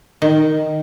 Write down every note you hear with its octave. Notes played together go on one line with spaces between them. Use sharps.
D#3